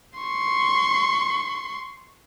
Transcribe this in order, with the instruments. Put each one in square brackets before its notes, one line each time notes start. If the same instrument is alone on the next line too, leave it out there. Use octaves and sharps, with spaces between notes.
[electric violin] C6 C#6